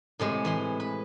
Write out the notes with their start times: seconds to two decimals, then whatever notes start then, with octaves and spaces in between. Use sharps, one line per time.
0.20 A2 C3 G#3
0.45 E3 E4 C6
0.80 B4